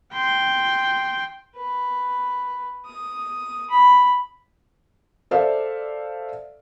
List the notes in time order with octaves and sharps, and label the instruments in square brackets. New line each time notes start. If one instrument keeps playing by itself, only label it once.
[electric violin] G5 C6
[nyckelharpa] B4
D#6
B5
[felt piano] A4 C5 D5 E5 F5